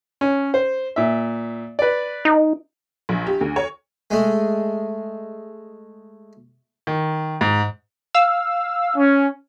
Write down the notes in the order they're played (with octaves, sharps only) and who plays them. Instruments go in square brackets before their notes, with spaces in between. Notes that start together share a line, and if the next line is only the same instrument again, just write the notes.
[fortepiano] C#4
C5
A#2 E5
B4 D5
[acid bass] D#4
[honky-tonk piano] A#1
G4
D2
C#5
[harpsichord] G#3 A3
[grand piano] D#3
G#2
[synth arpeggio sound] F5 E6
[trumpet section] C#4